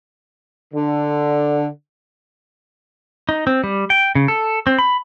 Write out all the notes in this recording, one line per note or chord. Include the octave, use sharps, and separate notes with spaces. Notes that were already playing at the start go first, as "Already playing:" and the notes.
D3
D#4
C4
G3
G5
C#3
A4
C4
B5